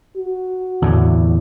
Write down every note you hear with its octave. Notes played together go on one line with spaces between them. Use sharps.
F#4
E2 A2 D3